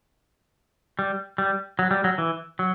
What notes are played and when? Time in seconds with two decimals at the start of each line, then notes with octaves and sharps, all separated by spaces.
0.99 G3
1.38 G3
1.79 F#3
1.91 G3
2.04 F#3
2.18 E3
2.59 F#3